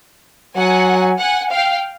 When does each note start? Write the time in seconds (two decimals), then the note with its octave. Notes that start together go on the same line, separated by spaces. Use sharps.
0.56 F#3 F#5 G#5
1.20 F#5 G#5
1.52 F5 G5